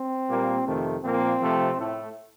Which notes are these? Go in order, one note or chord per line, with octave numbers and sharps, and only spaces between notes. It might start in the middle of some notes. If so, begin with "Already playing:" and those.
Already playing: C4
A#2 G3 A#3
F2 C3 D#3 A3
A#2 F3 A#3 C4
C3 F3 A3
A2 A3